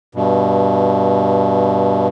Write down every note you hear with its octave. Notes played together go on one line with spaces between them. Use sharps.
G2 B2